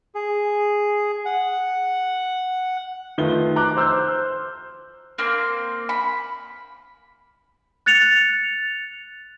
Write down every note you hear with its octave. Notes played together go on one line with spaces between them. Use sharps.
G#4
F#5
D#3 A3 F4 B4 G7
A#5 D6 F#6
C5 E6 F6 G6
A#3 C4 C6
B5
F#6 A6 C#7 F7